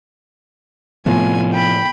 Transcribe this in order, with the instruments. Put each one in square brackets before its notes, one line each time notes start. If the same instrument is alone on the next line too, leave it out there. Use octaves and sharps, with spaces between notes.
[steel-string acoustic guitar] A2 F4 [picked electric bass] C3 F3 B3 [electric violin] G#5
[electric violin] G5 B5